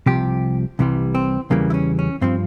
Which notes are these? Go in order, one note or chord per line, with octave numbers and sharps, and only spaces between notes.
C2 C3 F3 G4
C2 C3 E3 G3
C4
E2 C#3 E3 G3 A#3
E4
C#4
C#4
G2 F3 C4